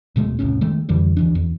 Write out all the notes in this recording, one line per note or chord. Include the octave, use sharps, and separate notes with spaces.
D1 B2 G#3 A3
E1 C2 A2 C#4
D#3 G#3 A3
F2 D3 E3 G3
D2 E3 D4
E2